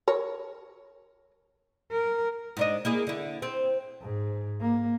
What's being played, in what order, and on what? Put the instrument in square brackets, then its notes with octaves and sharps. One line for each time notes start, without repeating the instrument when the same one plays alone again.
[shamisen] A#4 C#5
[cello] A#4
[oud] G#2 D4 D#5
A#3 E4 G#4
D3 E4
C4
[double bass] G#2
A#3